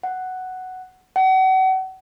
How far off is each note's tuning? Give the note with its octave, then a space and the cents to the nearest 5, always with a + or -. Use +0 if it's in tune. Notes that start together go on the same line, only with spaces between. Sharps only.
F#5 +5
F#5 +35